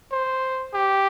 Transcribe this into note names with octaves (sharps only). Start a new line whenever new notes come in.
C5
G4